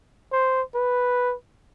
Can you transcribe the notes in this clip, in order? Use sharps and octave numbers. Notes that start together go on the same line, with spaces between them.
C5
B4